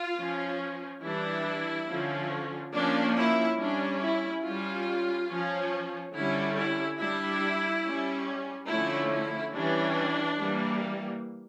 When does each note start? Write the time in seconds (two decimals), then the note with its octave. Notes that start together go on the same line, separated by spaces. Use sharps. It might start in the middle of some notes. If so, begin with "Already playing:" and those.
Already playing: F4
0.18 F3 C#4
1.02 E3 G3 D4 E4
1.87 D3 F3 C#4
2.73 F3 A#3 C#4 D4
3.16 E4
3.58 G3 C#4 D4
4.00 E4
4.43 G3 C#4 F4
5.29 F3 C#4
6.14 D3 G3 C#4 E4
6.55 E4
6.99 G3 D4 E4
7.84 G3 C#4
8.69 D3 F3 A3 C#4 E4
9.11 E4
9.53 E3 G3 C#4 D4
10.39 E3 G3 A#3